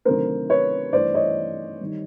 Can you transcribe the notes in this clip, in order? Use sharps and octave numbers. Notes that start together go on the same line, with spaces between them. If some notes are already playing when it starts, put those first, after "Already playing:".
D2 C3 D#3 F#3 A3 A#4 C5
B4 C#5
G2 E3 A3 C5 D5
C#5 D#5
D#3 G3